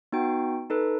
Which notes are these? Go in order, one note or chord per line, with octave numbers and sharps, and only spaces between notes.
B3 D#4 F#4 G5
D#4 A4 B4